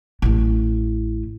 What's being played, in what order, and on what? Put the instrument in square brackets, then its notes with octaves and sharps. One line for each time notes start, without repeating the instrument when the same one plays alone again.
[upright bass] A1 E4